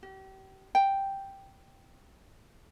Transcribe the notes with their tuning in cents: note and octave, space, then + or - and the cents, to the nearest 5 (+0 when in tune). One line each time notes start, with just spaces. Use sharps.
G4 -35
G5 +0